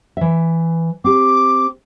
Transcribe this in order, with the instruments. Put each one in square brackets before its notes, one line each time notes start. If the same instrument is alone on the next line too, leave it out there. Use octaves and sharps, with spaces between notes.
[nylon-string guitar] E3 E5
[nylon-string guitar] C4 G4 [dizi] D6